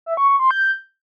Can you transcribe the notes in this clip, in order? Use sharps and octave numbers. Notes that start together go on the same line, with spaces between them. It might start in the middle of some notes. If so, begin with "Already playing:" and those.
E5
C#6
C#6
C6
G6